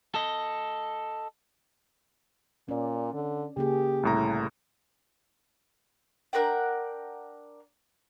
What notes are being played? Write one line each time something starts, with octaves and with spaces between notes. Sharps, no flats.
A4 D#5
A#2 C#4 D5
D3
C#3 A#3 G4 G#4
C2 A2 A#5
D4 A#4 F#5 G5